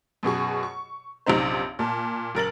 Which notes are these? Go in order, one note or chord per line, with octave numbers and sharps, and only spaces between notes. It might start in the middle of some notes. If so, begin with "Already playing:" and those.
F#2 B2 G#4 C#6
C#6
A#1 F#2 C3 D#4 C5
A#2 A5
F#1 A#4 A6 F#7